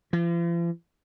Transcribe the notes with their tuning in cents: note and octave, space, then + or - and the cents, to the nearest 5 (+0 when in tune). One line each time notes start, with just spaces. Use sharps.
F3 -45